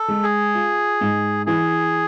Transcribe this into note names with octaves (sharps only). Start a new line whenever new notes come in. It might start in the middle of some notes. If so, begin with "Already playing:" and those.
Already playing: A4
G#3
G#4
F4
G#2
E3 G#4